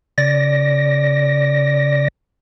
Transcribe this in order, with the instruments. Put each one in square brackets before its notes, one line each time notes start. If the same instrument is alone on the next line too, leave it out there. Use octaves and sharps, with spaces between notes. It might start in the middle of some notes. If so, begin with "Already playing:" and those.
[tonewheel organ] C#3 D5 A#6